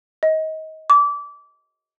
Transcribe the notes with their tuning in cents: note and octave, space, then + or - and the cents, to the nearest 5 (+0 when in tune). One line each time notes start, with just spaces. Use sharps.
D#5 +25
D6 -25